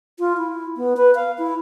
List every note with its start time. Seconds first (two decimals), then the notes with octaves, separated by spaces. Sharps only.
0.19 F4
0.38 E4
0.77 B3
0.97 B4
1.15 F5
1.38 E4